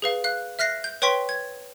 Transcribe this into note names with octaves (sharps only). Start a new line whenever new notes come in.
G#4 B4 F5
F5 F#6
E5 F6 F#6 A#6 C7
G6
B4 C#5 G5 C6 C#6 B6
G#6